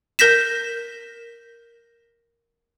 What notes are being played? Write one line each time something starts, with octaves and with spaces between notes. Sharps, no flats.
A#4 G6 A#6 B6 E7